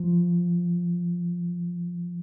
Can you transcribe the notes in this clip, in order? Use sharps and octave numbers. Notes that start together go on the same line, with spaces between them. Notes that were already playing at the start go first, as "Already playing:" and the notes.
Already playing: F3